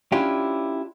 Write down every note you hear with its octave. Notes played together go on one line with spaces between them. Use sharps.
C#4 D4 E4 F4 G4